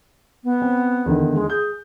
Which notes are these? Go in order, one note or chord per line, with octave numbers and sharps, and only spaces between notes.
B3
C4
E2 D3 D#3
G#3
G#4 G6